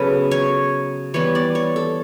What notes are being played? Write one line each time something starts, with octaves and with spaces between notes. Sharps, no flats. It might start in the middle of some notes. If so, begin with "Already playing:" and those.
Already playing: C#3 F#3 B3 A4 B4
C#5
E3 G3 B3 C#5
D5
C#5
A4